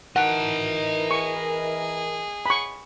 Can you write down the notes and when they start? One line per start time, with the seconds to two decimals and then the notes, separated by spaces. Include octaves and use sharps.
0.16 E3 D#4 A#4 D#5 F#5 A5
1.11 G#4 C#6
2.46 B5 C#6